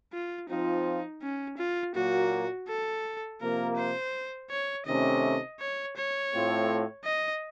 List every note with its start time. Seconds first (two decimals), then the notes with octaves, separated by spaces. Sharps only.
0.13 F4
0.49 F3 C4 D#4 F4
1.22 C#4
1.58 F4
1.94 A#2 F#3 A#3 F#4
2.68 A4
3.41 C3 F3 A#3 A#4
3.76 C5
4.50 C#5
4.86 C3 D#3 A3 C#4 D#5
5.59 C#5
5.96 C#5
6.32 A2 A3 C4 F4
7.05 D#5